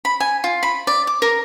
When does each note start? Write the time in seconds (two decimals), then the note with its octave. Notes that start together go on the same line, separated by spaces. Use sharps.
0.05 B5
0.20 G#5
0.44 F4
0.63 B5
0.87 D5
1.07 D6
1.22 A#4